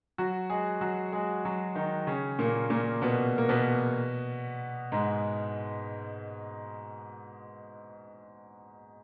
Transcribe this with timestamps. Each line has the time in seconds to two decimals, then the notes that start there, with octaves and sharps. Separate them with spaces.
0.18 F#3 F#4
0.50 G#3 G#4
0.81 F#3 F#4
1.12 G#3 G#4
1.45 F#3 F#4
1.75 D#3 D#4
2.07 C#3 C#4
2.39 A#2 A#3
2.70 A#2 A#3
3.02 B2 B3
3.38 A#3
3.49 B2 B3
4.92 G#2 G#3